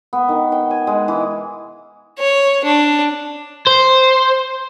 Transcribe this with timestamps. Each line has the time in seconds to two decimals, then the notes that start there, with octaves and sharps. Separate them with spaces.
0.13 B3
0.29 D#3
0.52 G5
0.71 G#5
0.87 G#3
1.08 E3
2.18 C#5
2.64 D4
3.67 C5